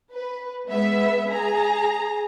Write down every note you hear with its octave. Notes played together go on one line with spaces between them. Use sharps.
B4
G#3 B3 E5
G#4 A#5